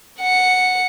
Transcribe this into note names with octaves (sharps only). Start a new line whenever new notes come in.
F#5 C#7